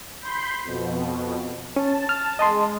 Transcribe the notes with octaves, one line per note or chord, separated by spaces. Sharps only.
B5 C6 G6
F2 B2
C#4 A5
F6
G#3 D#5 A5 C6